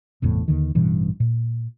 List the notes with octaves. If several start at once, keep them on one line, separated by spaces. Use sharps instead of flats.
G1 E2 A2 C3
D#2 D3 D#3
A1 G2 B2 E3
A#2